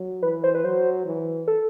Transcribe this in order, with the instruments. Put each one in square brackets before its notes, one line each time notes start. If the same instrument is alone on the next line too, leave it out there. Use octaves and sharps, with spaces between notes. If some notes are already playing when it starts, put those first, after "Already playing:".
Already playing: [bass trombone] F#3
[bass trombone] E3 [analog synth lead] B4
[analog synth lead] C5
B4
[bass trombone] F#3 [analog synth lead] C5
[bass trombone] E3
[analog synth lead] A4